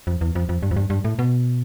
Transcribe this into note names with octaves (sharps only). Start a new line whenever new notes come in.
F2
E2
F2
F2
G2
F2
G2
G2
A2
B2